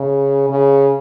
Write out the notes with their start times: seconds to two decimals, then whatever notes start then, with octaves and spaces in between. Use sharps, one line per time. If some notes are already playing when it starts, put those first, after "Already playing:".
Already playing: C#3
0.50 C#3